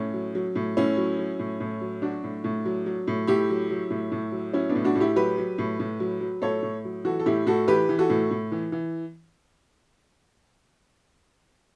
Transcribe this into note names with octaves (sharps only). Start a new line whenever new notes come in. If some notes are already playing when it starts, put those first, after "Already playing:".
Already playing: A2 C#4
F#3
F#3
A2
A2 C#4 E4
F#3
F#3
A2
A2
F#3
F#3 D4 F#4
A2
A2
F#3
F#3
A2
A2 E4 G4
F#3
F#3
A2
A2
F#3
F#3 C#4 E4
B3 D4
A2
D4 F#4
A2
E4 G4
F#3 G4 B4
F#3
A2
A2
F#3
F#3
A2 A4 C#5
A2
F#3
E3 F#4 A4
A4
A2 E4 G4
A2 F#4 A4
E3 G4 B4
E3
F#4 A4
A2
A2
E3
E3